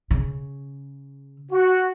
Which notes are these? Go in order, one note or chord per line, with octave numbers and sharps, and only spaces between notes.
C#3
F#4